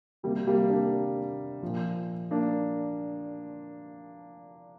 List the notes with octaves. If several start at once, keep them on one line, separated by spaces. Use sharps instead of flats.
C3 D#3 G3 A#3
G3 A#3
A#3 D4
A#2 F3
A#3 D4